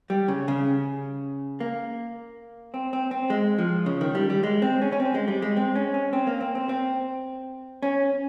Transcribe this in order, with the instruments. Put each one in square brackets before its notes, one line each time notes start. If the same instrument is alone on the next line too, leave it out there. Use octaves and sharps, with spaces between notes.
[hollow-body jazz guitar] G3
C#3
C#3
A#3
C4
C4
C4
G#3
F3
C#3
D#3
G3
G3
G#3
C4
C#4
C#4
C4
G#3
G3
G#3
C4
C#4
C#4
C4
A#3
C4
C4
C4
C#4